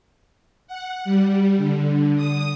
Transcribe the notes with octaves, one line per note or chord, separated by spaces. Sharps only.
F#5
G3
D3
D#6